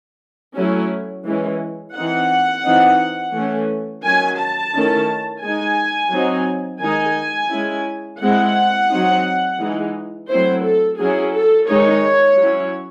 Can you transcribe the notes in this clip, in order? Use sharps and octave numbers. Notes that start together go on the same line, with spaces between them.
F#3 A3 C#4 E4
E3 G#3 C#4
E3 C4 D#4 F#5
E3 C4 D#4
E3 A3 C#4
D#3 F#3 C#4 G#5
A5
D#3 A3 C#4 E4
G#3 D#4 G#5
F#3 C4 D#4
D#3 G#3 D#4 G#5
G#3 C#4 E4
G#3 C4 E4 F#5
F#3 C4 D#4
E3 G#3 D#4
F#3 A3 C4 E4 C5
A4
F#3 C#4 E4 G#4
A4
D#3 G#3 D#4 C#5
F#3 C#4 E4